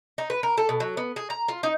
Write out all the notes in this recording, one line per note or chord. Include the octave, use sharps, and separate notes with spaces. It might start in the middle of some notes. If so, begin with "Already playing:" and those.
D#4
B4
A#4
A4
B2
F#3
B3
G#4
A#5
F4
D#4